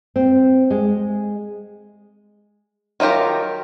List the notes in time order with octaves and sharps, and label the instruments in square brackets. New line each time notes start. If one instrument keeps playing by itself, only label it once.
[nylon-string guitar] C4
G#3
[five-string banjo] D#3 F#3 F4 G4 A#4